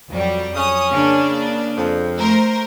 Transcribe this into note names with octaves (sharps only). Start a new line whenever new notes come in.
F2 F#3 G3
C#4 D#6
C#3 A#3 D4
F2
A3 A#4 C5